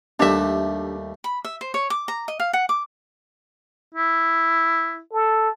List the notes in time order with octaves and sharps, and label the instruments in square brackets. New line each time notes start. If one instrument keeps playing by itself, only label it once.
[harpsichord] D#2 G3 A3 [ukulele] D4 E5
[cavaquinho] B5
E5
C5
C#5
D6
A#5
D#5
F5
F#5
D6
[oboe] E4
[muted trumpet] A4